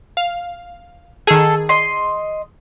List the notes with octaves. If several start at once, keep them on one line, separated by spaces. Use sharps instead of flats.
F5
D#3 G#4 A4
D#5 C6